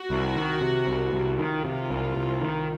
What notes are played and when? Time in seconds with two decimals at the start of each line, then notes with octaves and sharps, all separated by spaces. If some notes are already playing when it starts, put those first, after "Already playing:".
Already playing: F#4
0.10 C2
0.36 D#3
0.61 C3
0.87 C2
1.13 C2
1.39 D#3 F4
1.65 C3
1.90 C2
2.16 C2
2.42 D#3